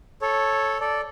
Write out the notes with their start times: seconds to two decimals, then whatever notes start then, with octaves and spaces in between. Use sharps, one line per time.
0.22 A4 C#5
0.81 A4 D5